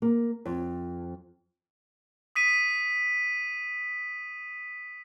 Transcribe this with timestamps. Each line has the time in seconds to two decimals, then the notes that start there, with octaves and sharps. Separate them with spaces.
0.02 A#3
0.45 F2
2.35 D#6 B6 D#7